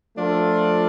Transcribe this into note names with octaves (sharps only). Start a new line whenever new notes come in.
F3 A3 D4 F4 A4